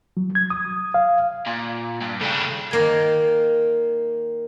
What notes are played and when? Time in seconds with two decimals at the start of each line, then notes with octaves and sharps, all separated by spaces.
0.17 F#3
0.35 G#6
0.50 D#6
0.94 F5
1.46 A#2
2.01 G2
2.21 C#3 A3 D4 G5
2.71 D#3 A#3 G#5